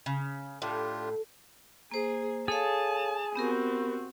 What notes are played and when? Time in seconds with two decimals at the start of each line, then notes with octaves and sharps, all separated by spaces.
0.06 C#3
0.62 A2 D4 F4 G4
1.91 A#3 G#4 C5
2.48 G#4 A4 C#5 F5 A5
3.35 B3 C4 F#4 G4 A#4